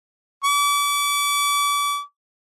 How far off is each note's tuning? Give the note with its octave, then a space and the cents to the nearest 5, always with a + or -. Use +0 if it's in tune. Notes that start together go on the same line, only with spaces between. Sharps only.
D6 -35